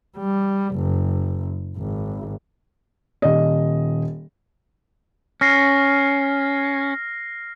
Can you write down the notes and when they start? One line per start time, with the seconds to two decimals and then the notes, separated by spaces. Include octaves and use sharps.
0.17 G3
0.75 F#1
1.77 G#1
3.22 D#1 D#5
5.41 C#4 F6 A#6 C7